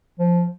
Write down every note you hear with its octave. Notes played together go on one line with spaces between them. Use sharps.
F3